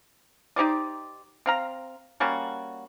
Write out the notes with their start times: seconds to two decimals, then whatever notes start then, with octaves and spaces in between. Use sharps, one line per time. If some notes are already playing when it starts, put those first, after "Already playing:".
0.56 D#4 G4 C5 D5
1.46 C4 F5 A#5
2.20 G3 A#3 C#4 F#4